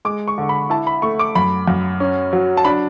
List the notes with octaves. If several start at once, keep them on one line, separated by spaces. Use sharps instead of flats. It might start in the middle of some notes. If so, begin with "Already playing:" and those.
G#3 D6
C#6
D3
B5
E4 A5
B5
A3 C#6
D6
F#2 B5
F#2
C#4
F#3
A5
D4 B5